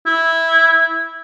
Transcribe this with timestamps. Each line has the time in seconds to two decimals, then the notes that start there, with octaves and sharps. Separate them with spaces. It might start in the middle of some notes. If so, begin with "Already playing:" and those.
0.06 E4